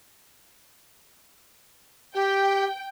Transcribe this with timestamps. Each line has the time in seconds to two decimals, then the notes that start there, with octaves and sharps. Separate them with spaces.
2.14 G4 G5